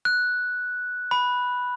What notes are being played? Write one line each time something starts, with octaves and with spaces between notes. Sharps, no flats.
F#6
B5